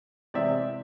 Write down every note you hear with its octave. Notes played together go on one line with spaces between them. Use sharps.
C3 E3 G#3 C4 D5 E5